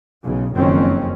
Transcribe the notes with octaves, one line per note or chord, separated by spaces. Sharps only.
B1 C#3
F#1 F2 D#3 C4 C#4